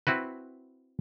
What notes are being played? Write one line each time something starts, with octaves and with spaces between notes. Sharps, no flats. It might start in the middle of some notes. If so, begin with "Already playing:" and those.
C4 E4 F#4 B4